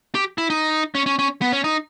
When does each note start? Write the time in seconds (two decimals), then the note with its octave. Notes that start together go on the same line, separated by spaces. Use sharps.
0.15 G4
0.38 E4
0.50 D#4
0.95 C#4
1.06 C#4
1.19 C#4
1.42 B3
1.52 C#4
1.64 D#4